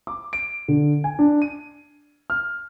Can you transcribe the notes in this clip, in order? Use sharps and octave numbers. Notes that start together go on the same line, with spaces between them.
D6
D7
D3
G#5
D4
D#7
F6